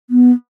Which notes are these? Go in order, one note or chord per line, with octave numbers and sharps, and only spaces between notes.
B3